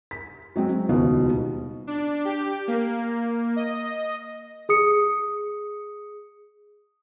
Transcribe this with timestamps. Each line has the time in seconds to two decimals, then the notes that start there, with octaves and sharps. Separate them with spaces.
0.11 B6
0.56 F#3 G#3 C4
0.69 C4
0.89 D#1 C#2 B2 D#4 F4
1.87 D4
2.25 G4
2.68 A#3
3.56 D#5
4.69 G#4 D#6 C#7